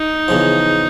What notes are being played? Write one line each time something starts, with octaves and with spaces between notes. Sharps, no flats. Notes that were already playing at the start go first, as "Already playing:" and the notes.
Already playing: D#4
E2 C#3 F3